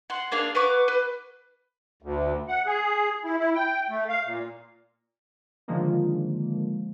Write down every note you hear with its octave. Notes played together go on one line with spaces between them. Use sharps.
F#5 C6
A#3 D4 G#4 F5
B4 F#5 C#6 D6
B4
D2
F#5
G#4
E4
E4
G5
A3
F5
A#2
D3 D#3 F3 G#3 A#3